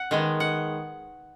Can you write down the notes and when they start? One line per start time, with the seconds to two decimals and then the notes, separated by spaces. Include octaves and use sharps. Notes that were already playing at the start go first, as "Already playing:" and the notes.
Already playing: F#5
0.11 D#3 G#3 B3
0.40 F#5